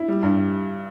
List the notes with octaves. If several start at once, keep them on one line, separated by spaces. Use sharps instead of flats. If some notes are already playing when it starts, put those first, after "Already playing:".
Already playing: E4
G3
G2